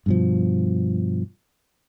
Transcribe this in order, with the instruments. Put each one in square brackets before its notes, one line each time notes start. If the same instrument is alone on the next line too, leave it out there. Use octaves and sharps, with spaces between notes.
[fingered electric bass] G2 B2 F3